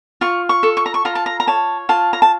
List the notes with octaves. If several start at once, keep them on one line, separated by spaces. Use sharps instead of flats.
F4 C#6
C#6
A4
C#6
A#5
C#6
F4 A#5
A5
A#5
A#5
C#5 A5
F4 A5
A#5
A5